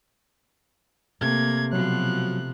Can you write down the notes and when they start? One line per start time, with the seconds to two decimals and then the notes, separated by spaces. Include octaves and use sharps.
1.21 C3 A3 A#3 G#6
1.73 B2 F3 F#3 F#6